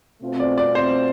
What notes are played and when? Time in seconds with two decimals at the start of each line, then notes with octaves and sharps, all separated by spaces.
0.21 B2 A3 C4 F4
0.40 D5
0.58 D5
0.75 C5